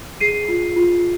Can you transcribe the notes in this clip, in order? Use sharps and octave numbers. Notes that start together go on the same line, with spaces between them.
G#4 C7 D#7
F4
F4